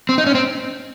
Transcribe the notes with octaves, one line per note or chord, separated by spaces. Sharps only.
C4
D#4
C#4
C4